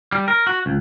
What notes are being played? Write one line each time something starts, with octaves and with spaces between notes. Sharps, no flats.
G3
A#4
F#4
C#2